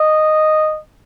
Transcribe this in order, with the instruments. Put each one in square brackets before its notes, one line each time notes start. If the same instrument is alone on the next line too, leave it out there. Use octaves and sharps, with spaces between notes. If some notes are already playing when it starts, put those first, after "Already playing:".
Already playing: [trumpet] D#5